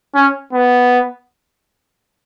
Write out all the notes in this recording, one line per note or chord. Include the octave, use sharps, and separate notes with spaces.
C#4
B3